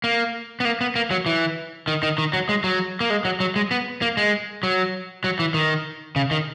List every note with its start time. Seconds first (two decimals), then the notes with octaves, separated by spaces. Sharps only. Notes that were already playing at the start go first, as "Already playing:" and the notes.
0.04 A#3
0.60 B3
0.65 A#3
0.81 B3
0.96 A#3
1.11 F#3
1.26 E3
1.88 D#3
2.03 D#3
2.18 D#3
2.33 F#3
2.49 G#3
2.64 F#3
3.01 A#3
3.10 G#3
3.25 F#3
3.40 F#3
3.56 G#3
3.71 B3
4.02 A#3
4.17 G#3
4.63 F#3
5.24 F#3
5.39 E3
5.54 D#3
6.16 C#3
6.31 D#3